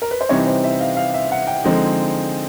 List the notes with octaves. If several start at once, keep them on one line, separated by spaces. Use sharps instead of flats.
A#4
B4
C5
C3 E3 G3 C4 D#4 C#5
C5
E5
F5
F5
E5
F#5
G5
D3 F3 G#3 C4 D#4